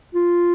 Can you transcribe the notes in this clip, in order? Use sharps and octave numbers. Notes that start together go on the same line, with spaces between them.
F4